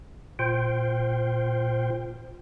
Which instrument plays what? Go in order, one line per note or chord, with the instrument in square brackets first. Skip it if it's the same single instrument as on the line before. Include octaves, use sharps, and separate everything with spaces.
[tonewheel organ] A#2 F4 C5 G5